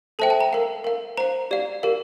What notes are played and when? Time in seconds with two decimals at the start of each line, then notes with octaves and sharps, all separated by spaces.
0.19 A4 C5 E5 G5 A5
0.30 A5
0.41 A#5
0.53 A#4 F5
0.84 A#4 F5
1.17 C5 F5 A#5
1.51 G4 D5 F5
1.83 G4 A#4 F5